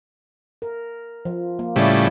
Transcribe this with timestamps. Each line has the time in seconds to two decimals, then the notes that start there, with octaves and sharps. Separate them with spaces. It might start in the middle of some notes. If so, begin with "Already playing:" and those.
0.62 A#4
1.25 F3
1.59 A#3
1.76 A2 C#3 F3 G3 E4 D5